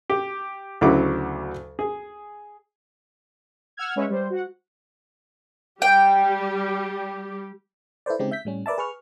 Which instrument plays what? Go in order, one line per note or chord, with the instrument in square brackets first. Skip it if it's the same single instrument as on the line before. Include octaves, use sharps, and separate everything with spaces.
[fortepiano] G4
D2 C#3 F#3 E4 F#4 D6
G#4
[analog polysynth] F#5 E6 F6 G#6
G#3 C#4 B4 C#5 E5
G3 C5
F#4 F#5
[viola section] G3 G4 [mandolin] G5
[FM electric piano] E4 A4 B4 C5 D5
C#3 G#3 C4 D#4 G4
E5 G6 B6
A2 G3 C#4
A#4 B4 D5 E5 A5
G#4 B4 C#6 F6